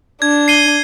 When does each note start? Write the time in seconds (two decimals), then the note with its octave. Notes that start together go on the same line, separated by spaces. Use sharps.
0.22 D4 G#6
0.48 C7 D#7 G7